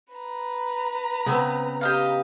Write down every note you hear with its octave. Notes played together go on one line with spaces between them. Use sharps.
B4 A#5
C#3 B3 C4
G4 D#5 F5